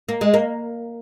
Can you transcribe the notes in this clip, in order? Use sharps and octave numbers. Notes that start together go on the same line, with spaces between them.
A#3
G#3
A#3